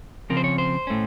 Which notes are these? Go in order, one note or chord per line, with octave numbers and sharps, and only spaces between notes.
C#3 F3 C4 A#4
C5
C#5
C5
A2 A3 C#4